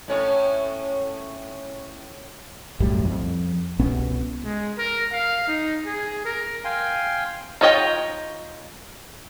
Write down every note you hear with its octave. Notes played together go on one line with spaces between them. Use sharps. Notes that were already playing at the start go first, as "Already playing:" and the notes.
A2 C#4 C#5
B1 F#2 A2 G3
F2
C2 B2 B3 C#4
G#3
A#4
F5
D#4
G#4
A#4
F5 G5 G#5 C6
D#4 F4 C#5 D#5 G5